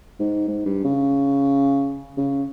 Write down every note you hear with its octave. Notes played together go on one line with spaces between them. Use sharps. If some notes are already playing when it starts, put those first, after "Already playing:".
G#2
G#2
G2
C#3
C#3